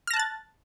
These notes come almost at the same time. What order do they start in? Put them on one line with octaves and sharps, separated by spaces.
F6 A#6 A5 F#6 A6